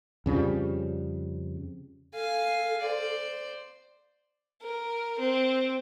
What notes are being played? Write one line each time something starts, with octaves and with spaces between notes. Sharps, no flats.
F2 C#3 F3 G3
A4 F5 G#5
C5 D5
A#4
C4